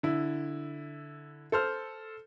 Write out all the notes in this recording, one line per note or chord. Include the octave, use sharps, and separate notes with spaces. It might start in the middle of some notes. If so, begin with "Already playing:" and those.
D3 E4
A4 C5 F6